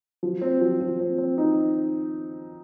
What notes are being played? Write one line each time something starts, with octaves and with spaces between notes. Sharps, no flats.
F3
C4
F3
F3
C4
C4
D#4